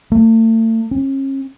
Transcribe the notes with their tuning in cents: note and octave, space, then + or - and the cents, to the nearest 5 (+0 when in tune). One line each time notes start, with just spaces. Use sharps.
A3 +40
C#4 -40